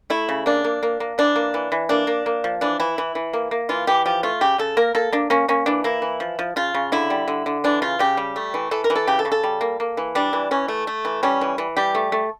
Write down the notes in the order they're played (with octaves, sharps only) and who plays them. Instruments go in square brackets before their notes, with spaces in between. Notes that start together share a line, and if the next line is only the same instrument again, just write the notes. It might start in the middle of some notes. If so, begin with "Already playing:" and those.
[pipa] A3 E4
C#3
A#3 D4
A#3
A#3
A#3
E3 D4
A#3
E3
E3
A#3 D4
A#3
A#3
F3
E3 D4
E3 E4
E3
E3
A#3
A#3
E3 F4
E3 G4
F3 G4
A3 F4
C#3 G4
C#3 A4
A#3 A#4
A#3 A4
A#3 D4
A#3 C#4
A#3 C#4
E3 D4
A#3 E4
E3
F3
F3
C#3 F4
C#3
D3 E4
G3
D3
D3
E3 D4
C#3 F4
C#3 G4
G3
A3
E3
E3 A4
A#4
E3
A4
C#3 G4
A4
C#3
A4
G3
A#3
A#3
E3
G3 D4
E3
E3 C#4
A3
A3
E3
G3 C#4
E3
E3
G3 G4
A3
A3